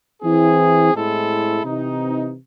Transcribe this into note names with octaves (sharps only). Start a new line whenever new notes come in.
E3 C4 E4 G#4
A2 G#3 C4 E4 A4
C3 E3 C4 D#4